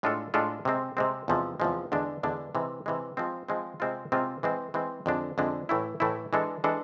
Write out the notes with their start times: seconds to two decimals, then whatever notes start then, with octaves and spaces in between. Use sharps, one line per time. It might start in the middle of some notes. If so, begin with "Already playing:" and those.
0.03 A2 G#3 D4 F4 A4
0.34 A2 G#3 D4 F4 A4
0.65 C3 G#3 C4
0.97 C3 G#3 C4
1.28 E2 C3 F3 G#3
1.60 E2 C3 F3 G#3
1.92 E2 D3 G#3 D4
2.23 E2 D3 G#3 D4
2.55 C3 E3 G#3
2.86 C3 E3 G#3
3.17 F3 G#3 C4
3.49 F3 G#3 C4
3.80 C3 G#3 C4 F4
4.12 C3 G#3 C4 F4
4.43 E3 G#3 C4
4.74 E3 G#3 C4
5.06 F2 D3 G#3 D4
5.38 F2 D3 G#3 D4
5.69 A2 E3 A3 E4
6.00 A2 E3 A3 E4
6.33 E3 G#3 D4 A4
6.64 E3 G#3 D4 A4